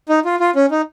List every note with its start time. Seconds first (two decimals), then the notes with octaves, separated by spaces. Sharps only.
0.09 D#4
0.25 F4
0.40 F4
0.55 C#4
0.71 D#4